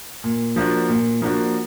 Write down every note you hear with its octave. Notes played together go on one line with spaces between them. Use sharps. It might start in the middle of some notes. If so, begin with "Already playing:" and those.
A#2
F3 A#3 D4 F#4
A#2
F3 A#3 D4 F#4